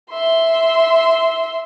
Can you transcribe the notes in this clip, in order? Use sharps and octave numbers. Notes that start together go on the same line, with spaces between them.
E5 C6